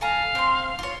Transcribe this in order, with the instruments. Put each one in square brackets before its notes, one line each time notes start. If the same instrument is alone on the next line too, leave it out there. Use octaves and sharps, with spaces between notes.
[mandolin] A4 G#5 A#5 [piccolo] F5
[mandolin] C4 C6
F4 C#5